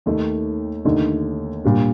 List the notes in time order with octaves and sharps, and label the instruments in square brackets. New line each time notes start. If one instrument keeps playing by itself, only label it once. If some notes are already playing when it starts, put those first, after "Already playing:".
[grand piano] D#2 D#3 A3 D#4
D#2 D3 A3 D#4
A#2 G3 D4